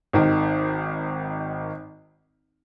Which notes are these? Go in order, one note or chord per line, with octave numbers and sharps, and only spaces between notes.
G#1 D#3